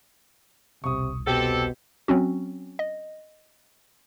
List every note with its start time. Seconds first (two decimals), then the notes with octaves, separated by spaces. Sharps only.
0.84 E1 C2 C3 C#6 D#6
1.27 B2 C4 G4 A4
2.08 F#3 C4 C#4 F#4
2.79 D#5